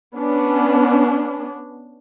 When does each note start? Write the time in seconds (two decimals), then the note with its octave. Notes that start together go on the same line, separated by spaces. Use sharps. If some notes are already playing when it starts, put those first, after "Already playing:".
0.16 B3 C#4 D4